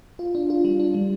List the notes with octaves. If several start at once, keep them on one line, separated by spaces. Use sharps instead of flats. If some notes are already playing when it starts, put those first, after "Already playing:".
F4
D4
F4
G3
D4
G3